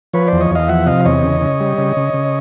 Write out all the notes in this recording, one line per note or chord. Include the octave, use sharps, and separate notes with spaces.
F3 B4 C#5
E2 C5 D5
C#5 D#5
E2 D#5 F5
F3 E5 F#5
C3 D#5 F5
E2 C#5 D#5
C#3
C#3
G3
C#3
C#3
C#3